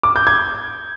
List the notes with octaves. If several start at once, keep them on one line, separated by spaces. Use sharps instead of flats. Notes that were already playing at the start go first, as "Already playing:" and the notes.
D6
G6
G#6